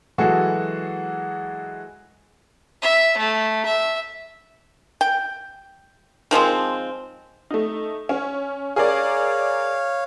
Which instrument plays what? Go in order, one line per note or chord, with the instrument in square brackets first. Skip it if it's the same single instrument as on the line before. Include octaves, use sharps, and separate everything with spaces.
[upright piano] E3 F#3 G#3 F#4 G#4 A4
[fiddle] E5
A3
E5
[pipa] G5
D#3 F3 G#3 C4
[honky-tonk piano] A3 D#4
C#4
[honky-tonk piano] G#4 A#4 D5 [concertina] C#5 F5